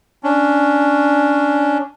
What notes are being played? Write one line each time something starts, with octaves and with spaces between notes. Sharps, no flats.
C#4 D4